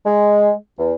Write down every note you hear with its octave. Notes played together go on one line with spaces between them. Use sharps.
G#3
E2